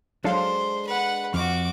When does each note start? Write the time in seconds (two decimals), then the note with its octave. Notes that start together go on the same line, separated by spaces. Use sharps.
0.24 F#3 G#3 D4 A4 C5 F5 C6
0.87 B4 F#5
1.34 F2 F#4 D6 F6